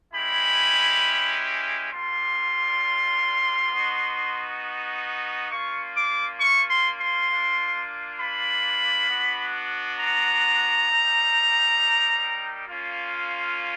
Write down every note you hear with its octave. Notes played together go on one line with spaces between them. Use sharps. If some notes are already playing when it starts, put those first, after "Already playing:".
G#3 C#4 E4 G4 B5
G3 A#3 D4 F4 C6
B3 D#4 F#4
A#3 C#4 F4 C#6
D6
C#6
C6
C6
A#3 D4 F4
B5
B3 D4 F#4
A#5
G3 A#3 D#4 G4
A#3 C#4 F4